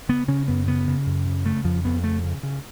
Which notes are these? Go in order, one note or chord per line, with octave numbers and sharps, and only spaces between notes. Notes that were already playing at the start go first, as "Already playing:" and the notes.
C#3 B3
C#3 C#4
F#2 B3
C#3 B3
C#3
F#2
C#3
C#3 A3
F2 F3
F2 B3
C#3 A3
C#3
C#3